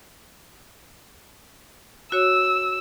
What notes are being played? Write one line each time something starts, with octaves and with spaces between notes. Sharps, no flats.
F#4 C#5 E6